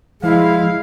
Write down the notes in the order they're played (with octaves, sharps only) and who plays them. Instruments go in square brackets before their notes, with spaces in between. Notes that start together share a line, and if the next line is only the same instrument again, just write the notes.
[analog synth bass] F3 [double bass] G#3 [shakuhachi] E4 [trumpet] F5